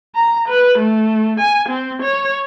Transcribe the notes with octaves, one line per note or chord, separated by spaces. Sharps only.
A#5
B4
A3
G#5
C4
C#5